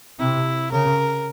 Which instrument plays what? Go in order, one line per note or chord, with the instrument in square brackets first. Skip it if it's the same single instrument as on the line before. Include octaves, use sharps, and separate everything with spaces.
[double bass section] C3 [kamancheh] E4
[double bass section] C#3 [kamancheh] A#4